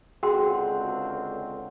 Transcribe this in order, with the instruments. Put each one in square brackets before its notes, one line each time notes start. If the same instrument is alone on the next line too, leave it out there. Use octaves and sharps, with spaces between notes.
[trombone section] C#2 D3 C4 [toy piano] F#4 G5 C6 [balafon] G#4 [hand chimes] F#5